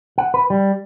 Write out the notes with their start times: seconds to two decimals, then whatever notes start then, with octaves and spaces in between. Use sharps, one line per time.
0.18 F#5
0.34 B4
0.50 G3